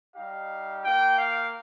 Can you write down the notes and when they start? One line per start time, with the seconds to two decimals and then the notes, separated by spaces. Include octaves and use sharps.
0.16 G3 D#4 G4 F5
0.84 A#3 F4 G5
1.19 F5